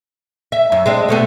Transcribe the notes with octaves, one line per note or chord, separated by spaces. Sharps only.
E5
F#2
G#3 C4 D4
B2 A3 B3